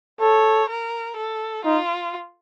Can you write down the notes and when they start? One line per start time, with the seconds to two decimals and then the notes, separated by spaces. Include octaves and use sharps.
0.21 A4 C#5
0.70 A#4
1.17 A4
1.65 D#4 F4